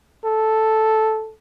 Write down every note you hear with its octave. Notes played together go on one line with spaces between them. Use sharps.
A4